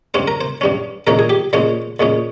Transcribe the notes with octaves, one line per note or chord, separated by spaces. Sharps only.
G2 G3 C#4 C5
A#4
C5
G2 G3 C#4
A#2 G#3 C#4 A#4
G#4
G4
A#2 G#3 C#4 C5
A#2 G#3 C#4